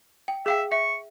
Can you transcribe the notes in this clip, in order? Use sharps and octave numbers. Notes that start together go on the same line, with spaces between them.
G5
G#4 E5 F5 G5
E5 C#6